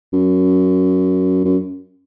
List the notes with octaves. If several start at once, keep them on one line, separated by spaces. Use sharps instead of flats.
F#2
F#2